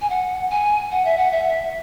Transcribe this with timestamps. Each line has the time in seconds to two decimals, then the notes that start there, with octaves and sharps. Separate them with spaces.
0.01 G#5
0.10 F#5
0.51 G#5
0.91 F#5
1.05 E5
1.18 F#5
1.32 E5